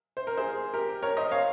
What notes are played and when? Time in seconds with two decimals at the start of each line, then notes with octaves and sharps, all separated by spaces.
0.17 C5
0.27 A#4
0.37 G#4 C5
0.74 G4 A#4
1.03 A#4 C#5
1.17 C5 D#5
1.32 C#5 F5